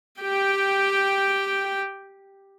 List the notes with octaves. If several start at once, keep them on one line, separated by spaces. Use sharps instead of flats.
G4 G5